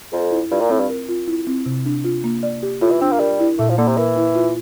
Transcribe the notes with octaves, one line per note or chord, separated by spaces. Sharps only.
F2 A4
E4
G2 F4
A#2
A2 C4
G2
A#4
F4
E4
C4
C3
D4
F4
A#3
D5
G4
A2 F4
E3
C4 D4
A#3
G3 A#4
E4
A#2 A3
F3
D3 A#3
C3
E3 A#4
E4
F4